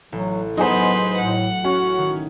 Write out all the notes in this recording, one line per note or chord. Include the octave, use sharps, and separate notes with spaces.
A1 F#3
F#3 B3 D#4 G#4 B4 C5 C6
A2 F#5
C#4 F#4
D#3